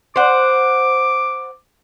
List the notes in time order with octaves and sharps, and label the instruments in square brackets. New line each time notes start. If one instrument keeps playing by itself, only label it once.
[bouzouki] C5 F#5 [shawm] D6